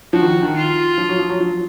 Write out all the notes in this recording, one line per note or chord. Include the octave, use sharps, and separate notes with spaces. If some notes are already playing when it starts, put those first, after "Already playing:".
F3 F#4
D#3
D#3
F4
F3
F#3
F3
F#3
F3